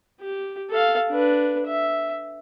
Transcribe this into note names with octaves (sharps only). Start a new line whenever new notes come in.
G4
A4 F5
D4 B4
E5